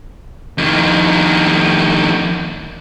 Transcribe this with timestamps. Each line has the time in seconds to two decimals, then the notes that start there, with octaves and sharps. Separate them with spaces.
0.58 F2 D#3